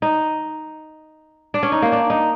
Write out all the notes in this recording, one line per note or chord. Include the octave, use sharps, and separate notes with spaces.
D#4
D4
C#4
D#4
A#3
D4
D#4